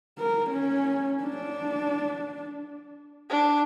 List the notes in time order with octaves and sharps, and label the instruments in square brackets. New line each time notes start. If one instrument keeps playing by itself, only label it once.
[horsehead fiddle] A#4
C#4
D4
[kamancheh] D4